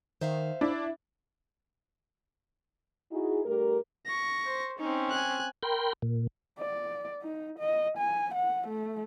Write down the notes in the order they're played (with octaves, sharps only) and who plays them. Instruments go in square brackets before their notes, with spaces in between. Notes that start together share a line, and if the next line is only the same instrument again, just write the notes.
[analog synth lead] D#3 [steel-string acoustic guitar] C5 E5 F5
[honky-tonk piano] D4 [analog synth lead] E4
[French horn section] D#4 E4 F#4 G#4
G2 A3 G4 A#4
[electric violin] C#6 A#6
[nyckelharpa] C5
[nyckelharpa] C4 C#4 [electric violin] D#4
[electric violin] G#5 F#6
[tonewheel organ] A#4 G5 B5 C6
A#2
[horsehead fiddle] D5
D#4
D#5
G#5
F#5
A3